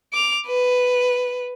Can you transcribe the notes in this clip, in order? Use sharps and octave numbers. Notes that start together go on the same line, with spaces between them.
D6 F7
B4